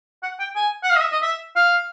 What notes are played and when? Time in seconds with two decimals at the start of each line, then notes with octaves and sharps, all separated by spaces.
0.23 F#5
0.40 G5
0.56 G#5
0.84 F#5
0.90 F5
0.96 D#5
1.01 E5
1.12 D#5
1.22 E5
1.56 F5